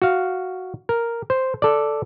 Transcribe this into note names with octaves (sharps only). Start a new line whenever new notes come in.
F#4 F5
A#4
C5
A4 D5